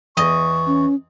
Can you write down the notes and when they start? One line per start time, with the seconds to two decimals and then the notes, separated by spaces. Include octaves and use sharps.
0.17 E2 D#5 C#6
0.66 C#4